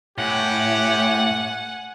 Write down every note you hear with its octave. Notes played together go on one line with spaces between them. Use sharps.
A2 G4 F#5 G#5